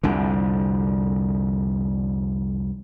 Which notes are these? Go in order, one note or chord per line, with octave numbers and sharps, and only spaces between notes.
C2 F2 D3